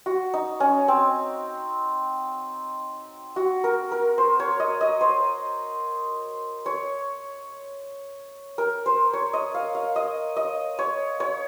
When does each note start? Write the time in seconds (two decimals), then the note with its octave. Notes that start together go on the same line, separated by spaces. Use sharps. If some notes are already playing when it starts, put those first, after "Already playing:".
0.06 F#4
0.34 D#4
0.60 C#4
0.88 C4
3.36 F#4
3.64 A#4
3.91 A#4
4.18 C5
4.40 C#5
4.60 D#5
4.81 D#5
5.01 C5
6.66 C#5
8.58 A#4
8.86 C5
9.13 C#5
9.33 D#5
9.54 F5
9.75 F5
9.96 D#5
10.36 D#5
10.79 C#5
11.20 C#5